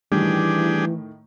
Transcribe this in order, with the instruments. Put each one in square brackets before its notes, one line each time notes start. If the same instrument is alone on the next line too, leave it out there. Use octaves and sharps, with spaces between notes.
[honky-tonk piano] A2 D#3 [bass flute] E3 [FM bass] G3 [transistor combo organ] D4 G4 G#4